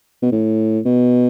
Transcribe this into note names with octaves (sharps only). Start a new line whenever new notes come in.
B2
A2
B2